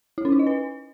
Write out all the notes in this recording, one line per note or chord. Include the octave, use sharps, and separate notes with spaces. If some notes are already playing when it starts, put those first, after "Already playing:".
E4
C#4
D#4
D#5
B4